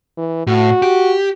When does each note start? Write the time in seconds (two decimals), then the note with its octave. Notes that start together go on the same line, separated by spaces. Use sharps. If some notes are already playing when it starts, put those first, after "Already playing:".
0.17 E3
0.47 A2 F#4
0.82 G4